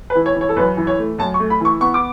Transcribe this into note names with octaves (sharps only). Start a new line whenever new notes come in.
B4
E3
C#5
E3
C#5
A4
F#2 B4
E3
C#5
A3
F#2 A5
C#6
A3
B5
E3 C#6
B3 C#6
D6